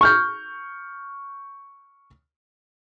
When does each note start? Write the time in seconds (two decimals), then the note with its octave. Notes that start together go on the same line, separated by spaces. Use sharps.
0.01 C#6 F6 G6